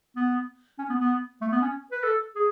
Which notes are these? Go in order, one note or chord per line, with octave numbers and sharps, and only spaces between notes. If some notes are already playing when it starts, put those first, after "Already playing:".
B3
C#4
B3
B3
A3
B3
C#4
B4
A4
G#4